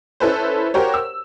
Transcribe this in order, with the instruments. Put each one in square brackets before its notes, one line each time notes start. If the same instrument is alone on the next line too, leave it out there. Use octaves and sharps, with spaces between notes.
[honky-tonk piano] C#4 E4 A4 B4 C5
F#4 G4 A#4 C5 C#5
E6